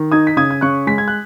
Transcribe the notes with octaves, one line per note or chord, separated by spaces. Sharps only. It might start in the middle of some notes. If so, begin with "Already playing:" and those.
Already playing: D#3
D#4 D#6 G#6
B6
C#3 D#6 G#6
G#6
C#3 C#6 F#6
G#3 B6
G#6
F#6